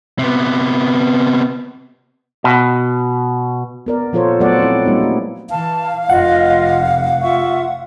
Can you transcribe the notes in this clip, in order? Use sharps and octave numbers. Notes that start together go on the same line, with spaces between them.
C3 B3
B2
B3 A#4 D5
A#2 F3 F4 A4 C5 C#5
F#3 A3 B3 A4 D5 F#5
C4 E4
G3 A#3 B3 D#4
A3
E3 F5 A5
F1 F4 D#5 F#5
F4 E5 C#6